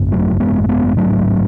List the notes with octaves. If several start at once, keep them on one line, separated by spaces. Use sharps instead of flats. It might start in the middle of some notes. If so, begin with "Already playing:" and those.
Already playing: G#1 F#2 C#3
F#3 A3
G#3 B3
A3
G#3 B3
G#3
A1 G#2 F#3 A3